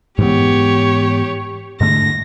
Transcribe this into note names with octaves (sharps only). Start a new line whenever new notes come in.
G#2 E3 B3 G4 C#5
G#2 D3 A3 A#6